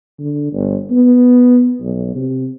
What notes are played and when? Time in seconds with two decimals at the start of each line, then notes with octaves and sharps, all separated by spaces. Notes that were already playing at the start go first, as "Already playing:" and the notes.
0.19 D3
0.53 G1
0.91 B3
1.81 B1
2.15 C3